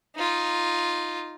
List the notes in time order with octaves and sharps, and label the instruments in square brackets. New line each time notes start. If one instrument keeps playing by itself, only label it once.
[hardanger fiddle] D#4 F4